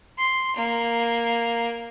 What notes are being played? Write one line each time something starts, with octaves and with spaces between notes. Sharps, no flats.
C6
A#3